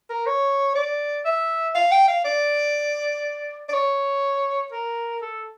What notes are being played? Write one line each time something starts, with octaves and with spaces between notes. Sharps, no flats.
A#4
C#5
D5
E5
F5
G5
F5
D5
D5
C#5
A#4
A4